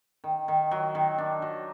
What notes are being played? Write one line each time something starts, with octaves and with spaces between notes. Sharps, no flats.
D#3
D#3
F#3
D#3
D4
F#3